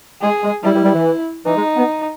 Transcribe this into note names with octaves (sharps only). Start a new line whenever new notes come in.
G#3 G#4
G#3
G3 E4
G3
G3
E3
E3 D#4
G#3
B3